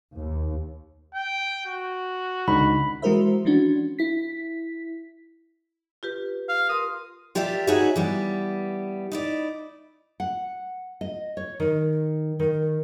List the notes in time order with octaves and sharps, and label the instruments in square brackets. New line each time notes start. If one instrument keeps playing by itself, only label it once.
[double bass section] D#2
[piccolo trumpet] G5
F#4
[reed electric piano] C#2 D3 D#4 [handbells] B5
[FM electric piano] E3 G#3 F#4 A#4 C5 E5
E3 F3 C#4 D4 F#4
E4 B6
[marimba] F4 G4 B4
[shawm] F5
[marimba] A#4 C6 [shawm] D#6
[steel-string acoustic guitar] F4 G4 A#4 D5 E5
D#4 F#4 G#4 B4 C#5 E5
E3 G3 B3
D#4 E4 D5
[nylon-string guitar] F#5
D#5
C#5
D#3
D#3